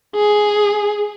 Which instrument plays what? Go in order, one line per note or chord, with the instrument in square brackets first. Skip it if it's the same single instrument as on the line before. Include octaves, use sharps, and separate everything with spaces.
[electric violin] G#4